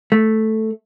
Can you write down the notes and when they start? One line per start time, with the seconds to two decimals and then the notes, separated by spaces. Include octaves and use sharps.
0.12 A3